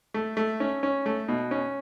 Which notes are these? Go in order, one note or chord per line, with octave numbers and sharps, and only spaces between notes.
A3
A3
C#4
C#4
A3
B2
C#4